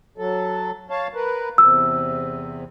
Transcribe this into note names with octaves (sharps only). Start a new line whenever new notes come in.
F#3 A4
C#5 F5 A5
A#4 B4
E2 C3 E6